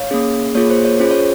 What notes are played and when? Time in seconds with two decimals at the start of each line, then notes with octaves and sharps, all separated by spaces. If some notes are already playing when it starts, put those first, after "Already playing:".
Already playing: C#5 F5
0.11 A#3 C#4 G#4
0.55 A#3 F4 G#4 C#5
0.70 C5
0.85 C#5
1.00 C#4 F4 G#4 C5
1.11 C#5